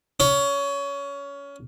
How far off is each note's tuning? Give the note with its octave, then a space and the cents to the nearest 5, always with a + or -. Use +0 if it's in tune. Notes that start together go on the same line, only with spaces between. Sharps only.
C#4 +20